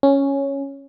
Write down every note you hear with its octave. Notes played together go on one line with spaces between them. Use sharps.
C#4